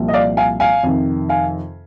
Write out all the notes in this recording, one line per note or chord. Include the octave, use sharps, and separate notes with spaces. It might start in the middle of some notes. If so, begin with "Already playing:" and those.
Already playing: C2 A#2 F3
D#5
D5 F5
F5 G#5
F5 G#5
F2 C3 D#3
F5 G#5